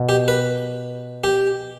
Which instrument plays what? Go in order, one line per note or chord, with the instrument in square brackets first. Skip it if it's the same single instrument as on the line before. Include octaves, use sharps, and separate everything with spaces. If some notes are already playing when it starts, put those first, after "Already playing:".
Already playing: [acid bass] B2
[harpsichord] G4
B4
G4